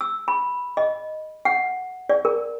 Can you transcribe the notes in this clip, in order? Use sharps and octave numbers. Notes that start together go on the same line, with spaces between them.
E6
B5
D#5
F#5
D5
A#4